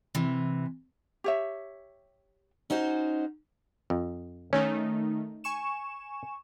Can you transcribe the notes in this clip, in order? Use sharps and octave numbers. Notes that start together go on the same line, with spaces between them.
C3 E3
G4 C#5 E5
C#4 D#4 F#4 C5
F2
D#3 A3 C#4 D#4
G#5 C#6 E7